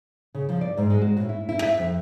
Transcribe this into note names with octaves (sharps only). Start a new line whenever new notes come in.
C#3
F3
D5
G#2
G#3
F#4
A2
E4
E4
E5
F2